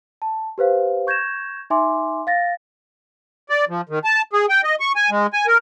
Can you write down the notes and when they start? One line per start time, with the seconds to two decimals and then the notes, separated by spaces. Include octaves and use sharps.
0.22 A5
0.58 G4 B4 C5 F5
1.07 C#6 G6 G#6 A#6 E7
1.70 D#4 E5 G#5 C6 D6
2.27 F5 A6 A#6
3.49 D5
3.69 F3
3.89 D#3
4.04 A5
4.33 G#4
4.49 G5
4.64 D#5
4.80 C#6
4.96 G#5
5.10 G#3
5.33 G#5
5.47 A#4